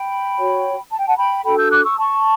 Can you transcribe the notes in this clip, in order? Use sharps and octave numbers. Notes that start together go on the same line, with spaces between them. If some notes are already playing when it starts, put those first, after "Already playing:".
Already playing: G5 B5
F#4 C#5
A5
G5
F#5 A5
G5 B5
D4 F#4 A4 G5 B5
E6 G6
D6 F#6
C#6 E6
A5 C#6